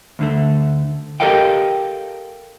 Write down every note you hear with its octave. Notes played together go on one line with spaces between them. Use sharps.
D2 D3 A3
G4 A4 A#4 D#5 F5 G5